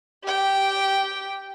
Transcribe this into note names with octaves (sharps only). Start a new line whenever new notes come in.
G4 G5